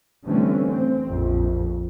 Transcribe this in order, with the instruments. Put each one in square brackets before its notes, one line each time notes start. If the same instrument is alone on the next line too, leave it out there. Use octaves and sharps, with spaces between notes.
[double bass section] D3 E3 G3 A3 C4 C#4
C4
A#1 F2